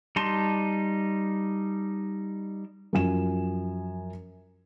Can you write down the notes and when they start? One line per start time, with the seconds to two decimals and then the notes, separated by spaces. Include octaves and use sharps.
0.16 G3 D#4 A5 C6
2.93 F#2 F3 G#5 E7